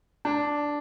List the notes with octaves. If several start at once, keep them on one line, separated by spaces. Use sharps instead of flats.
D4